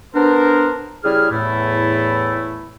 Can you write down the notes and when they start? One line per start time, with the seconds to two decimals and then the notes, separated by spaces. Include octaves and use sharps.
0.14 B3 D4 A#4 C5
1.04 C#3 G3 E4 G#4 F6
1.31 E2 A2 A3 E4